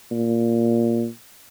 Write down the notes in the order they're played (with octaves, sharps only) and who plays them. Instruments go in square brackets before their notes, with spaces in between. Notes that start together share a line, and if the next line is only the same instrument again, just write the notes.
[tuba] A#2